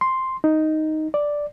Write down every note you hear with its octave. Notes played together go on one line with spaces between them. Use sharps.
C6
D#4
D5